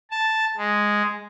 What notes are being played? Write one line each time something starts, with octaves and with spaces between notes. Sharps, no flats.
A5
G#3